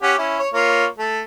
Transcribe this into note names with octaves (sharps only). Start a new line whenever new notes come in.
C#4 G4 F#5
C#4 E4
C#5
A#3 F4 C#5
A3